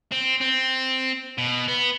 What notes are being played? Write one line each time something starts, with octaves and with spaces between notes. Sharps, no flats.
C4
C4
B2
B3